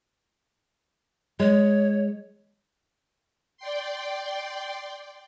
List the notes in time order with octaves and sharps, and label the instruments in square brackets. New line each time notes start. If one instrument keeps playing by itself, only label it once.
[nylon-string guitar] G#3 [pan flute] C#5
[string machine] D5 G5 C6